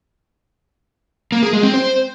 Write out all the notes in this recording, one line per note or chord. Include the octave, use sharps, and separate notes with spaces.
A#3
G#4
G#3
C4
C5